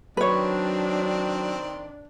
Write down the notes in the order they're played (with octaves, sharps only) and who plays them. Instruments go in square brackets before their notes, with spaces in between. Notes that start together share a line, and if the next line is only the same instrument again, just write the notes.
[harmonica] D#3 C4 D5 [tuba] F#3 [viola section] D4 [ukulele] B4 C#5